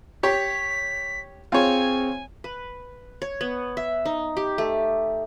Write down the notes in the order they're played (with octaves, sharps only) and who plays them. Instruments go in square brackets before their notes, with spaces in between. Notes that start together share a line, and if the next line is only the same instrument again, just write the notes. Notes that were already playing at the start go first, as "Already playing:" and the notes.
[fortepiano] G4 C#5 [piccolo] B6
[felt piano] C4 G#4 [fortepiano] F4 C#5 [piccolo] G#5
[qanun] B4
C#5
B3
E5
D#4
G4
A3